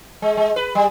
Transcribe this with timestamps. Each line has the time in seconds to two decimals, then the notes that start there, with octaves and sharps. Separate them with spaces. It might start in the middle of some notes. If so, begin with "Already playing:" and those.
0.22 G#3
0.37 G#3
0.56 B4
0.75 G3